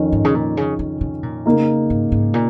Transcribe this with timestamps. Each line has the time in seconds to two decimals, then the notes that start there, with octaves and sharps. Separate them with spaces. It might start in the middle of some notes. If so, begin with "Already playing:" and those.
Already playing: F2 D#3 C#4
0.12 G#2
0.25 C#3
0.35 A#2
0.57 C#3
0.79 C#3
1.01 C#3
1.23 A#2
1.46 C#3 A#3 D#4
1.90 G#2
2.12 G#2
2.34 A#2